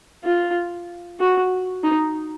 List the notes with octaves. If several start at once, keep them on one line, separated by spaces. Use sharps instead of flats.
F4
F#4
D#4